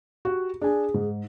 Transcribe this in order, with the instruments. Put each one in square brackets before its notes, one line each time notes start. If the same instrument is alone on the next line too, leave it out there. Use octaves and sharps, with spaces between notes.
[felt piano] F#4 G4
[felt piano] D4 G#5 [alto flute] G#4
[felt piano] G#2